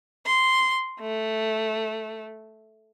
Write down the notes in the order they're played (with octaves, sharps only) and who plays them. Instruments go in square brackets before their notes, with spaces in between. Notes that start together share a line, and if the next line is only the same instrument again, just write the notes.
[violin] C6
A3